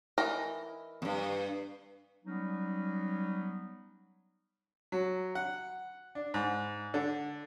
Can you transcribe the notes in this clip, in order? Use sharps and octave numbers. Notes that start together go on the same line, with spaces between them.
E3 A#4 D#5
E2 G2
F#3 G3 B3 C#4 D#4
F#3
F#5
D4
G#2
D3